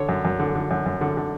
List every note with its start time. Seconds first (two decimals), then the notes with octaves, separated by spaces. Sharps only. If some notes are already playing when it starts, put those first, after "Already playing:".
Already playing: D3 C#5
0.09 F#2
0.25 F#2
0.40 D3
0.55 D3
0.71 F#2
0.86 F#2
1.01 D3
1.17 D3